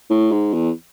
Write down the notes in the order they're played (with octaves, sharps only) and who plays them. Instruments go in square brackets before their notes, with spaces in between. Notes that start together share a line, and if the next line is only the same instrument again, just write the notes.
[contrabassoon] A2
G#2
E2